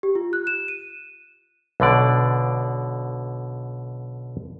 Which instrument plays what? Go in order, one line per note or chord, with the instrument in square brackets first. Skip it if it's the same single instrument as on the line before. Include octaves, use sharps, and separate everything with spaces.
[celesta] G4
F4
F#6
E7
D#7
[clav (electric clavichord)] B1 B2 D3 D5